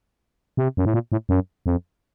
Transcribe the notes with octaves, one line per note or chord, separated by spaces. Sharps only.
C3
F#2
A2
A#2
A2
F#2
F2